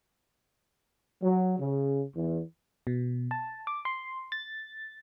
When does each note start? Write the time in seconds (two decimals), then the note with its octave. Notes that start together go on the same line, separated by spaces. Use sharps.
1.23 F#3
1.59 C#3
2.15 E2
2.87 B2
3.31 A5
3.67 D6
3.85 C6
4.32 A6